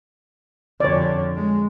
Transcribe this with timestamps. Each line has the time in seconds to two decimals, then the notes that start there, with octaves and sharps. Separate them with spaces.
0.80 F2 D3 C#5 D5
1.36 G#3